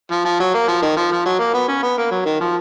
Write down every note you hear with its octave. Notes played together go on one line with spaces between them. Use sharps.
F3
F3
F#3
A#3
F3
D#3
F3
F3
F#3
A#3
B3
C#4
B3
A#3
F#3
D#3
F3